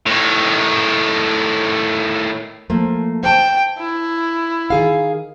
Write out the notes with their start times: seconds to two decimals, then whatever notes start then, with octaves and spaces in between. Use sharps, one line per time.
0.06 A2 D#3
2.70 F3 A3 A#3
3.23 C5 G5 A5
3.78 E4
4.70 D#3 G#4 F5